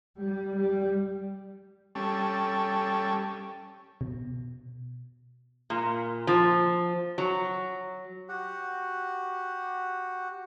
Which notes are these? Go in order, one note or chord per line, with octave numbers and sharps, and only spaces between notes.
G3
G3
G3 C#4 A4
B2
A#2
F3
F#3
F#4 G4 F#5